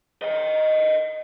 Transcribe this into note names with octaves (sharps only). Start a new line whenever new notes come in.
D#5 G5